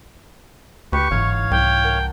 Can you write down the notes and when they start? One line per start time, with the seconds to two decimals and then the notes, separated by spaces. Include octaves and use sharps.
0.93 D2 G4 B4 C#6
1.11 G1 G#2 E3 C#4 C#5 F5
1.51 C2 G5 D6 B6 C#7
1.84 A#4 F#5 A5